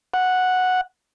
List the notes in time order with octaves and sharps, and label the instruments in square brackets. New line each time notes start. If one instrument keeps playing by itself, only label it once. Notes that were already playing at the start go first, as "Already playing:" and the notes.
[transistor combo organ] F#5